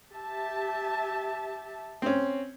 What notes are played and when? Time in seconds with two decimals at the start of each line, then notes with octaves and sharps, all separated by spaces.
0.11 G4 E5 A5
2.02 C4 C#4